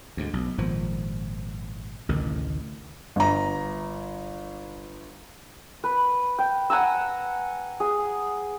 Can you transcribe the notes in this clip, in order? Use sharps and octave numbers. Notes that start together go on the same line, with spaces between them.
D2 G#2
B1
G#1 A#2 F3
A1 D2 C3 D#3
G1 A#5
B4
G5
F#5 G#5 A#5 E6
G#4